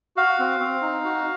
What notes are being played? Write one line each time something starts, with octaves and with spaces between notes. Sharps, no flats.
F#4 F5
C4
C4
D#4
F#4